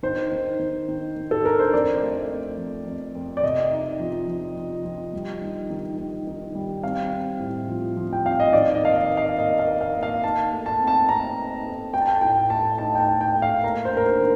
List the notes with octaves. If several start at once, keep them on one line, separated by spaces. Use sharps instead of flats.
D#3 C5
D#3
D#3
D#3
D#3
A4
D4 A#4
C5
F2 D5
A3
F2
F2
F2
F2
D5
C3 D#5
D#4
F3
F3
F3
F3
G3
D#3
D#3
D#3
D#3
G3
C4 F5
C4
A2
F3
F3
G5
C4 F5
D#5
D#3 D5
D#5
A#3 F5
D#5
A#3
F5
A#3 D#5
F5
A#3
F5
A#3
F5
D#4 A5
A3
A5
C4
A5
C4 A#5
D#4
A3
A3 G5
A5
G5
A2 G5
A3 A5
D#4 A5
G5
A5
D#4
G5
A3
F5
A#3 A#5
C5
D4 A#4
C5
D#3